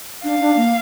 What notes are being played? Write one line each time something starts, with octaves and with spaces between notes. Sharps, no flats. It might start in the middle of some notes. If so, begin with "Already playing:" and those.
D4 F5
D4
A#3